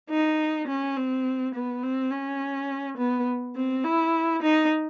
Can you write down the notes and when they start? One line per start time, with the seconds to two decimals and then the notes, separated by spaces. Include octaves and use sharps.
0.10 D#4
0.68 C#4
0.97 C4
1.54 B3
1.83 C4
2.11 C#4
2.98 B3
3.56 C4
3.84 E4
4.42 D#4